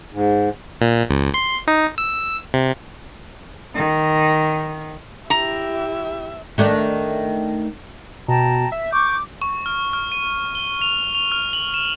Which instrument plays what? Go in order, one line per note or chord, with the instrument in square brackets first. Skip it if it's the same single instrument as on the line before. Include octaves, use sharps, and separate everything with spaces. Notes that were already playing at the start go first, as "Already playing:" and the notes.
[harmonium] G#2
[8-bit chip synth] A#2
C#2
C6
D#4
E6
C3
[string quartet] D#3
[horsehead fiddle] E4 G4 [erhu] E5 [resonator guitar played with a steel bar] A#5
[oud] D#3 A3 D4
[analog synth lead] B2 [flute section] G5 A5 A#5
[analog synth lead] E5
[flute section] C#6 G6 [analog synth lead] D6
[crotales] C#6
F6
F6
D#7
G7
F7
F7
F6
F#7
E7